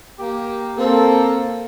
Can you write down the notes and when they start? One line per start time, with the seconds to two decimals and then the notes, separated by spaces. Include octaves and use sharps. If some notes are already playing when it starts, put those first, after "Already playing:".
0.19 A#3 G4
0.77 A#3 C4 A4